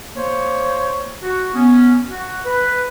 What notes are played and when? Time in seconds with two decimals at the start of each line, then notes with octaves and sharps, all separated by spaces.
0.16 A#3 C5 C#5
1.21 F#4
1.54 B3 C#4
2.08 F#4
2.45 B4